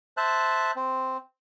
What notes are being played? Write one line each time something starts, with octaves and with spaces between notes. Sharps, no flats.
C5 E5 A5 F#6
C4